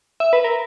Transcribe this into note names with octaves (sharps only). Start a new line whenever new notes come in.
E5
B4
A#4